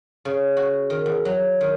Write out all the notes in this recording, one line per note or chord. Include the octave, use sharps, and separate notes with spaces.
C#3
F#4
D#3
E2
F#3
D#3